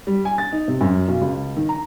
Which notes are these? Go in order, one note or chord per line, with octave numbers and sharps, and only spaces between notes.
G3
G#5
A6
D#4
C3
F#2
B1
C#2
D#3
A#5